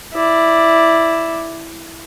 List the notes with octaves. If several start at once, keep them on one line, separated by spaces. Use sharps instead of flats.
E4 D5